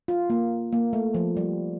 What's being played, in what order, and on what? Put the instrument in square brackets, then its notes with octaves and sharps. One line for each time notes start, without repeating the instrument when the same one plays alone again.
[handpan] F4
A#3
A#3
A3
F3
G3